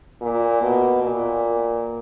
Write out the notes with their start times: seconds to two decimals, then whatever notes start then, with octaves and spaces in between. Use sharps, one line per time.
0.21 A#2
0.62 B2
1.04 A#2